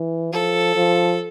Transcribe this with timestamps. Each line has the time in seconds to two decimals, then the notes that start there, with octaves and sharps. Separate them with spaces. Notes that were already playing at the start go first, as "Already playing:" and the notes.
Already playing: E3
0.32 F3 A4
0.76 F3